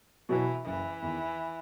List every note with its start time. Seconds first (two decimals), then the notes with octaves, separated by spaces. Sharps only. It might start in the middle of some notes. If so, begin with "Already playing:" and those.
0.29 B2 E3 F#3 B3 E4
0.65 F#1 E3
1.02 E2 D#3